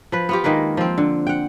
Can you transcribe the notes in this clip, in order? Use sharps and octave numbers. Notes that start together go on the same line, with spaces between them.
F3 B4
B3 F4 G4
D#3 G#3 A#3 B4
F3 C4
D3
F#5 G5